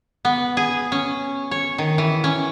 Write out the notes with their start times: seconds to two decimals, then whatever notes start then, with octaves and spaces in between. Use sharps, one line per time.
0.25 B3
0.57 G#4
0.92 C#4
1.51 C#5
1.78 D#3
1.98 E3
2.24 C#4